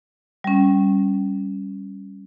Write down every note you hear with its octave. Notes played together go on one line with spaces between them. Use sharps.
G3 C#4